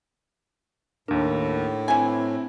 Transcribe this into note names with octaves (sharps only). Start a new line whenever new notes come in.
D#2 A2 D4 A#4
E3 C4 E4 G#5